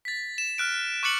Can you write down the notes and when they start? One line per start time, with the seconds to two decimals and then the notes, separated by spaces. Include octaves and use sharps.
0.05 A6 B6
0.38 E7
0.58 F6 F#6 D7
1.03 C#6 D6 F#6 A6 C#7 F#7